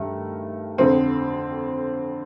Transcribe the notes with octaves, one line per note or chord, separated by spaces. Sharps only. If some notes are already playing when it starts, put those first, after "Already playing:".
Already playing: G2 D#3 A3
F2 D3 C4